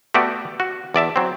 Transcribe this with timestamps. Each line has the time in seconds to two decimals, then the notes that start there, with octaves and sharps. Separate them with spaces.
0.14 A3 B3 F#4 G4 D5
0.60 F#4
0.94 E2 D5 E5 A5
1.16 F#3 C4